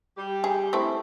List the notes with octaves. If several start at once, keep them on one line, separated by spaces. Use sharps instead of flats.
G3 G4
G#4
A3 C4 E4